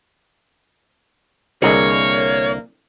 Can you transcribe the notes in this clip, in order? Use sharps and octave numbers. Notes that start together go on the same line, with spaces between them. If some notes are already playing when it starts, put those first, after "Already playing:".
C2 D3 A#3 G#4 A#4 C#5 D#5